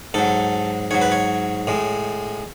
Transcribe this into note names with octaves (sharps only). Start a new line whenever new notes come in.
G#2 F#3 A4
G#2 F#3 C#5
B4
C#5
A2 G#3